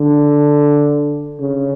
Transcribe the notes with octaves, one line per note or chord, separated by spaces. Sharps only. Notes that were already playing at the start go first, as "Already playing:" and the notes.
Already playing: D3
C#3